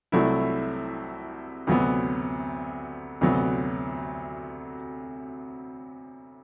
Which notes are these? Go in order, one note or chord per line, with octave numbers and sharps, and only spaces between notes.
C2 C3 F#3 A3 E4
D2 C3 F#3 B3
D2 C3 F#3 B3